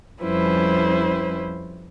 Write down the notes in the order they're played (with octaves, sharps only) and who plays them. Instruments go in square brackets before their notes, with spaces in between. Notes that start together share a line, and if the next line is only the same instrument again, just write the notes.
[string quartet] F2 G3 C#4 E4 B4 C5